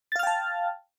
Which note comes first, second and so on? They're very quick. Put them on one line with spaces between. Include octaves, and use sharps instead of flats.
A6 F5 F6 G5 A5